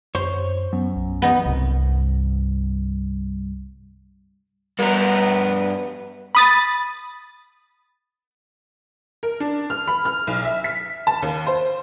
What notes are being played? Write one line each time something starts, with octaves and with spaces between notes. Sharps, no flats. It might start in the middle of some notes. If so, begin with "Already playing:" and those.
F#2 C5 C#5
F#2 B3
B1
E3 B3 D#4
C2 G2
G2 B3 A#4
B5 D#6 A6
A#4
D4
F6
B5
F6
B1
E5
B6
A5
D#2
C5